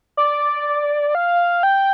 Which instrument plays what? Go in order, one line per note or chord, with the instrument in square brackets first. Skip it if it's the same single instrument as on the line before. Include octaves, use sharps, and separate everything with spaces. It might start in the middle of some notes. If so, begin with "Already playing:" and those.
[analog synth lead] D5
F5
G5